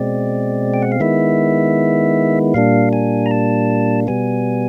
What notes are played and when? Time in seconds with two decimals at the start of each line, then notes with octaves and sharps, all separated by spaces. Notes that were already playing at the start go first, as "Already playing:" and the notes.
Already playing: B2 G#3 C4 D5
0.74 G5
0.82 F#5
0.92 F5
1.00 D#3 G#3 B3 E4 E5
2.54 A#2 G3 A#3 D4 F5
2.93 G#5
3.26 A#5
3.31 A5
4.07 B2 G3 B3 G#5